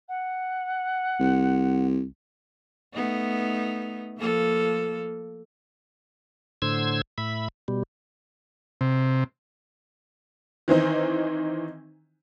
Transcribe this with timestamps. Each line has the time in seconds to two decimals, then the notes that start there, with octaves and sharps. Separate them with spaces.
0.08 F#5
1.20 C2
2.94 A3 B3 D#4
4.18 F3 A#3 A4
6.62 A2 D3 C5 E6 G#6
7.18 A2 E5 B5
7.68 B2 G3
8.81 C3
10.68 D#3 E3 C4 D#4